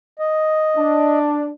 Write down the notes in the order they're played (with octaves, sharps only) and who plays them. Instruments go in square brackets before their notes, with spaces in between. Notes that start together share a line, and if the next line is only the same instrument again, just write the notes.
[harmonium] D#5
[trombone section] D4